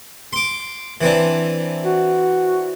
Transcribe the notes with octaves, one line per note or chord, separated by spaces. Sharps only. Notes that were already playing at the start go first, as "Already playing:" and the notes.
C6 D6
E3 C4 D4
F#4